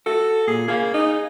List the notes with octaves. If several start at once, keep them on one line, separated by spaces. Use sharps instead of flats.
F#4 A4
A#2 G#4
A#3 G#4 F5
D#4